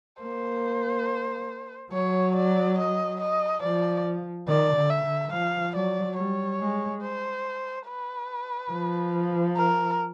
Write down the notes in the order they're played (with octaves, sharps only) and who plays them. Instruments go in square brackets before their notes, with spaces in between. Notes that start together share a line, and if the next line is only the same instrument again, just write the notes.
[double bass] A#3 [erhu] C5
[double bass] F#3 [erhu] C#5
[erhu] D5
D#5
D#5
[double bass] F3 [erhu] D5
[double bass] D#3 [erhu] D5
[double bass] D3
[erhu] E5
[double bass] D3
[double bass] F3 [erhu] F5
[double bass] F#3 [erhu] D5
[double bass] G3 [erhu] C#5
[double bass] G#3
[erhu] C5
B4
[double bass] F3
[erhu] A#4